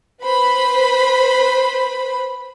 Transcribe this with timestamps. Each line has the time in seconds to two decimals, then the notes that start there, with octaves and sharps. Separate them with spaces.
0.23 B4 C5 B5